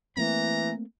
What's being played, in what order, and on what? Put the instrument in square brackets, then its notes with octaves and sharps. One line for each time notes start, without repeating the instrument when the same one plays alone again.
[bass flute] E3 [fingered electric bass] A3 A#3 C4 [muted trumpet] A#5